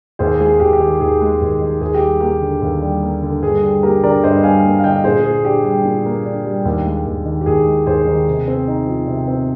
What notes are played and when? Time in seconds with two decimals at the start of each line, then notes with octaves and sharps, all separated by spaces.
0.19 D#2 G#4 C5
0.40 G#3 G#4
0.60 D#2 G4
0.73 G4
0.80 D#3 G#4
1.00 D#2 G#4
1.21 G#3
1.41 D#2
1.61 D#3
1.81 D#2 G#4
1.94 G4
2.01 G3
2.21 A#3 G4
2.42 D3
2.61 D#2
2.82 G3
3.03 A#3
3.23 D3
3.42 G2 G#4
3.63 G3
3.83 A#3 G4 A#4
4.03 D3 A#4 D5
4.24 G2 C5 D#5
4.43 G3 F5 G#5
4.64 A#3
4.79 F5
4.84 D3 D#5 G5
5.04 A#2 G#4 C5
5.24 A#3 G#4
5.45 D4 G4
5.64 G3 G4
5.85 A#2
6.06 A#3
6.25 D4
6.45 G3
6.65 D#2
6.85 G#3
7.06 D#2
7.26 D#3
7.41 G4
7.46 D#2 G#4
7.67 G#3
7.86 D#2 G#4 C5
8.07 D#3
8.28 C3
8.47 C4
8.68 D#4
8.87 F3
9.07 C3
9.28 C4